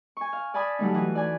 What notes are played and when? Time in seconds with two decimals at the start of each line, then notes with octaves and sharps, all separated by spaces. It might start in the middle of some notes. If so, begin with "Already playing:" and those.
0.17 G#5 C#6
0.33 F5
0.54 D5 G#5 A5 B5 D#6
0.79 F#3 G3 A3 D#4
0.94 E3 F#4
1.15 D5 G#5